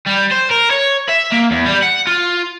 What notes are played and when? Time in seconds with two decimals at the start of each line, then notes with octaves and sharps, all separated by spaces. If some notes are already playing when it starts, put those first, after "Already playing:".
0.07 G3
0.32 C5
0.51 A#4
0.71 C#5
1.09 E5
1.32 A#3
1.51 E2
1.65 G3
1.82 F#5
2.07 F4